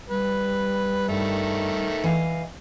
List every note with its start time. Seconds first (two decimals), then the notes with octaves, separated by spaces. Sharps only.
0.09 G3 B4
1.08 G2 D#3 A3
2.04 E3 D#5 F5